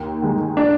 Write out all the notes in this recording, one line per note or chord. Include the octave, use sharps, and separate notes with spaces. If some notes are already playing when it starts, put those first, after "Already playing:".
Already playing: D#2
D#3 G#3
D4